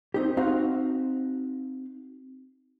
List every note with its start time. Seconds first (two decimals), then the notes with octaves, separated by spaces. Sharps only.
0.14 C4 D#4 G4
0.37 C4 D#4 F#4 F5